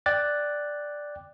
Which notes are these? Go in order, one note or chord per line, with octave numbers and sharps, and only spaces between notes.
D5 G5 D6 F#6 A6